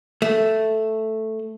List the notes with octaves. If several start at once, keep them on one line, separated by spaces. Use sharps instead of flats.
A3